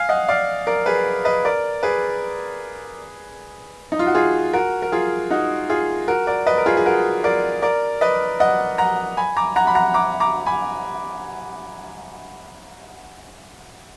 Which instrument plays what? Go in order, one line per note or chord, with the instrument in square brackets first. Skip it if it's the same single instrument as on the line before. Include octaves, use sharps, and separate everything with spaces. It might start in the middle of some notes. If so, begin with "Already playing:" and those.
Already playing: [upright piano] F5 G#5
D#5 F#5
D5 F5
A#4 D5
G#4 B4
B4 D#5
A#4 D5
G#4 B4
D#4
F4
F#4
F4 G#4
F#4 A#4
A#4
F4 G#4
D#4 F#4
F4 G#4
F#4 A#4
A#4 D5
B4 D#5
A#4
F4 G#4
G#4
F#4 A#4
A#4 D5
A#4 D5
B4 D#5
D#5 F#5
F#5 A#5
G#5 B5
A#5 D6
F#5 A#5
B5
F#5 A#5
A#5 D6
A#5 D6
G#5 B5